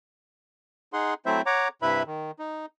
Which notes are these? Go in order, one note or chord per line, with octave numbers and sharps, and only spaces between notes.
D#4 G#4 F#5 C6
F#3 A3 C4 E4 C5 E5
C#5 F#5 A#5 D6
G2 C3 E4 B4 E5 B5
D#3
D#4